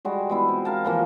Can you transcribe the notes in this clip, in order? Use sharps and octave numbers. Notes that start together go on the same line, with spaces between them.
G3 G#3 F#4
G#3 B3 E4
C3
A#4 F5 A5
E3 F3 A#3